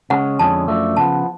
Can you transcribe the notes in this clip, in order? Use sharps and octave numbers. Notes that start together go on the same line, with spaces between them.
C#3 G#3 C#4 F#5
F2 D3 G#3 C#4 A5
F#2 F3 A3 D4
C#3 F3 B3 A5